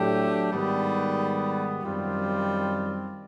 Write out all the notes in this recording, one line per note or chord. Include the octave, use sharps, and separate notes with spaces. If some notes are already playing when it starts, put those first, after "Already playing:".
Already playing: A2 F#3 A3 D4 G4
G#2 D#3 G3 B3
F#2 D#3 G3 C4 F4